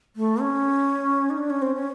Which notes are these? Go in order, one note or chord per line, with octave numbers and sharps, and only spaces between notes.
A3
C#4
D#4
D4
C#4
C4
C#4